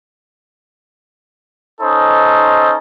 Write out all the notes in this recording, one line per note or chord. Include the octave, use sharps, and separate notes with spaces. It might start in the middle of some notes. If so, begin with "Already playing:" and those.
C#4 D#4 A4 C5 D#5